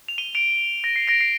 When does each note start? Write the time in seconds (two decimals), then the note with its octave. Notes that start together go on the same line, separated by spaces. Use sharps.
0.08 F7
0.18 D#7 G7
0.35 D7 F7
0.84 A#6 D7
0.96 C7
1.08 A#6 D7
1.21 C7